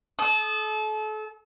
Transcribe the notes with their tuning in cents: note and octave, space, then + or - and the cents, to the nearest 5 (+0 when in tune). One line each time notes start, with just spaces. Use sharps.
A4 -35 D#6 -15